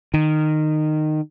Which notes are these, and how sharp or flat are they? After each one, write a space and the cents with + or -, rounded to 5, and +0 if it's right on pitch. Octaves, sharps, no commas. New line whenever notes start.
D#3 -15